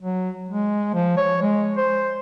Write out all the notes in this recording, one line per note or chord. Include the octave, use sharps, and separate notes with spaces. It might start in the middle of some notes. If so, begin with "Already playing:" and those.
F#3
G#3
F3
C#5
G#3
C5